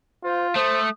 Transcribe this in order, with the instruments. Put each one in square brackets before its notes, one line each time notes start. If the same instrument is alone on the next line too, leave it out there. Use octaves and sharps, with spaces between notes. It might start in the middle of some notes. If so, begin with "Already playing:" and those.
[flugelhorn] F4 [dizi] C5
[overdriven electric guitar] A3 [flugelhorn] C5 [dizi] D#6